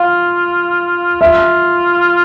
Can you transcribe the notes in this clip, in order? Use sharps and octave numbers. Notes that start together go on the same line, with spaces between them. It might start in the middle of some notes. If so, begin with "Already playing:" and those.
Already playing: F4 F5
F4 E5